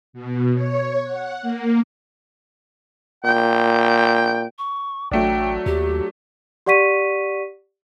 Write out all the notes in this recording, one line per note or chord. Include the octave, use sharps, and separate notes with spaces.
B2
C#5
F#5
A#3
A#2 G5
C#6
A1 F#3 A3 D4 G5
D#2 G4
G4 D5 F#5 C#6 B6 D#7